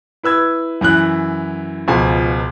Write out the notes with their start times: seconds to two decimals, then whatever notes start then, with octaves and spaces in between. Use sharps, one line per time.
0.23 E4 B4 E6 G#6
0.81 F#2 E3 E4 F#6
1.88 C#2 B2 F3 G#5